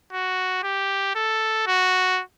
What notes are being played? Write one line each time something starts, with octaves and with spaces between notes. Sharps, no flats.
F#4
G4
A4
F#4